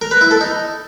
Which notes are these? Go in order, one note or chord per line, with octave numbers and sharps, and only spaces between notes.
A#4
B4
E4
A4
D#4